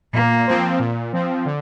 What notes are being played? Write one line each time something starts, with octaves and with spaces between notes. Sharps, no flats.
A#2 A#3
F3 C4
A#2
F3 C4
D3